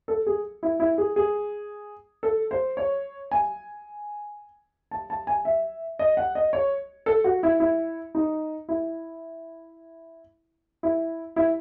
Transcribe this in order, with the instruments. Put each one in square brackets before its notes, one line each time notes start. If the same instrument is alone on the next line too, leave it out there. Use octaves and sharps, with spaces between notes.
[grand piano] A4
G#4
E4
E4
G#4
G#4
A4
C5
C#5
G#5
A5
A5
G#5
E5
D#5
F#5
D#5
C#5
A4
F#4
E4
E4
D#4
E4
E4
E4